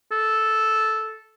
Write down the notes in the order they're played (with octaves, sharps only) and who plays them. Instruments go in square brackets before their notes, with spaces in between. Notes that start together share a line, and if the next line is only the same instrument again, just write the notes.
[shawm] A4